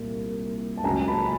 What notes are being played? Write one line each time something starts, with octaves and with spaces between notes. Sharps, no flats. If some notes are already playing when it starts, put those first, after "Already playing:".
Already playing: C2 A#2
A5
C#2 C#3 F#3 A#3 G#5 A#5
A5 B5